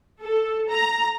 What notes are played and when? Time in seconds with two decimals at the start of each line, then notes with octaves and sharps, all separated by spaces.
0.23 A4
0.69 A#5